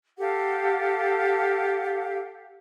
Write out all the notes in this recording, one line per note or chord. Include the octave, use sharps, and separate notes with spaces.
G4 A4 F5 F#5